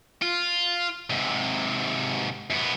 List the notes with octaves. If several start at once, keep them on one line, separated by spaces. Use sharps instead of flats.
F4
G#2 C3
F#2 B3